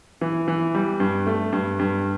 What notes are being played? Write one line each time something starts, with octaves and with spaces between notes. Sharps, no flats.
E3
E3
G3
G2
A3
G2
G2